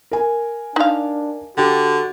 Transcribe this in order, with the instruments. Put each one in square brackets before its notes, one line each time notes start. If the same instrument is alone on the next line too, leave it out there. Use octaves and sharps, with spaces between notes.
[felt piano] A#4 G#5
[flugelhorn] D4 [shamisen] D#4 F5
[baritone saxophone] D3 [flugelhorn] F#4 [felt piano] G4